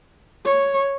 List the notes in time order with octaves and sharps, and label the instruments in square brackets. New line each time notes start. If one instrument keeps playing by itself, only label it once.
[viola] C#5